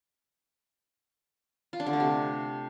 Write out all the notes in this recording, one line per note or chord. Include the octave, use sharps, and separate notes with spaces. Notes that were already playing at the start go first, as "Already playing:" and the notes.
F4
D4
D3
A3
C3